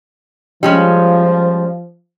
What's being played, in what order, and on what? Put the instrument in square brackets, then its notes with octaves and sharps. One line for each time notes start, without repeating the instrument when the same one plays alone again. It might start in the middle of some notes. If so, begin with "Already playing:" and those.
[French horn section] F3 [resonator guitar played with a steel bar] G3 G#3 C#4